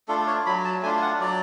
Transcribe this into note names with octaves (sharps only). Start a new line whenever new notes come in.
A3 D4 F4 A4
C#5
F#3 B5
A5
A3 D4 F4 G#5
F#5
F#3 D5